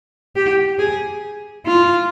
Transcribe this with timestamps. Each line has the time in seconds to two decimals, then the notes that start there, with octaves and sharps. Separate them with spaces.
0.36 G4
0.79 G#4
1.66 F4